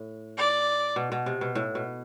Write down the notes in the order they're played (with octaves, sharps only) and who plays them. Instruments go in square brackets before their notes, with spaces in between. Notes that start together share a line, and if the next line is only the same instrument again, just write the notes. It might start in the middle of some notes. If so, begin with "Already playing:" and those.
Already playing: [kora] A2
[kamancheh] D5
[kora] B2
B2
C3
B2
A2
B2